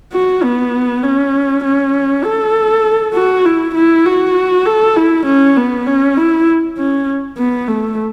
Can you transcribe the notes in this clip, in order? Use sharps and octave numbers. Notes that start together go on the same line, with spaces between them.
F#4
B3
C#4
C#4
A4
F#4
E4
E4
F#4
A4
E4
C#4
B3
C#4
E4
C#4
B3
A3